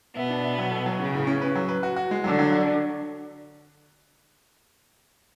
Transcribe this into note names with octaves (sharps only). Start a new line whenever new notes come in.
B2 B3 E5
D4
E5
F#3
A4
F#3
C#3 C#4
A2
C#4
B4
F#3
B4
F#4
F#4
G#3
D3 F#3
F#3
F#4